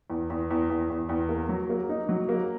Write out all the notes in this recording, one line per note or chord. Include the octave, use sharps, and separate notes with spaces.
E2
E2
E2
E2
E2
E2
A#3
F#3
A#3
D#4
F#3
A#3